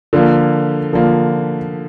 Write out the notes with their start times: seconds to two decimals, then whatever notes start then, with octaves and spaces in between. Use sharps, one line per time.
0.13 D3 F3 A#3
0.93 D3 F3 A#3